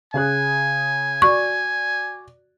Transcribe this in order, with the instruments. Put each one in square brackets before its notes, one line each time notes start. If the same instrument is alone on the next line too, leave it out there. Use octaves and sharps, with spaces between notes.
[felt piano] C#3 G#4 F#6 [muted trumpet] G#5
[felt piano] F#4 D5 [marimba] C#6